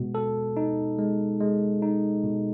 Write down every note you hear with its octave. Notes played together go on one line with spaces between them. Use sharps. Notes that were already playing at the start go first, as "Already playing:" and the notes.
Already playing: B2 G#3
A4
D#4
G#3
G#3
D#4
B2